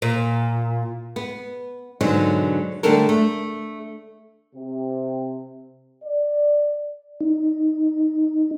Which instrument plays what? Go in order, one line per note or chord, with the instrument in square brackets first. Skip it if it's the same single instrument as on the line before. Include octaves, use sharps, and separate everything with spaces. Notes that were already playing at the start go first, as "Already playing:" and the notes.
[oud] A#2
[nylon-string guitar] B3
G#2 B2 D3 F#3 G#3
D3 G3 A3 D4 A4 A#4
A3
[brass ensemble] C3
D5
[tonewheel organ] D#4